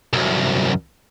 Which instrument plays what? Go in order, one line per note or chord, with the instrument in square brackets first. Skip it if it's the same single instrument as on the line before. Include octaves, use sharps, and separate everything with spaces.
[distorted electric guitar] C2 F#2